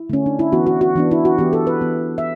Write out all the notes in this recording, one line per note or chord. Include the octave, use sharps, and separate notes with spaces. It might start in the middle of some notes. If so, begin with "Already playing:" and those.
Already playing: E4
D3 A3 C#4
D4
E4
E3 B3 F#4
F#4
F#4
E3 B3 D4
E4
F#4
E3 B3 G4
A4
B4
E3 B3
E5